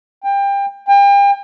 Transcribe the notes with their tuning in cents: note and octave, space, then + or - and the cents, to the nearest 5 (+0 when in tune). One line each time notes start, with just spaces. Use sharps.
G5 +25
G5 +40